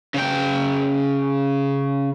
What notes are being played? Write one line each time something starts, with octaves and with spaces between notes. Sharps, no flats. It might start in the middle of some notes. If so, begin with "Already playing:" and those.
C#3 G5